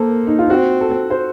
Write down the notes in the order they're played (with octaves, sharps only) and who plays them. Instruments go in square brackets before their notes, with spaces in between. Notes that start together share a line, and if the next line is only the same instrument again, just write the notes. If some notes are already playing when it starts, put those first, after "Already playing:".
Already playing: [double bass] A#3 [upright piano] A4 A#4 C5
[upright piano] D#4
F4
[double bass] C4 [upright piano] F#4
[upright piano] A4
C5